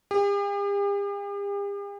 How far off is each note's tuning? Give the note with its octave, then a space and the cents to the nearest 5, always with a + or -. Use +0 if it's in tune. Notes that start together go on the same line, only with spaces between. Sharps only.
G4 +45